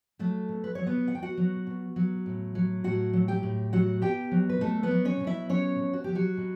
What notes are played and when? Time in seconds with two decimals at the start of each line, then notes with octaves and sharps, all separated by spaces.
0.19 F#3 A3 A4
0.49 B2
0.64 B4
0.75 F#3 C#5
0.86 B3 B4
1.07 B2 F#5
1.15 G5
1.23 F#4 F#5
1.37 F#3
1.67 B2
1.96 F#3
2.26 A2
2.55 F#3
2.84 A2 F#4 F#5
3.13 F#3
3.28 G4 G5
3.43 A2
3.73 F#3 F#4 F#5
4.02 B2 G4 G5
4.31 F#3
4.49 B4
4.61 B2 A3 A4
4.83 B3 B4
4.91 F#3
5.05 C#4 C#5
5.20 B2
5.27 E4 E5
5.49 F#3 C#4 C#5
5.79 B2
5.93 F#4
6.04 F#3 G4
6.15 F#3 F#4
6.37 B2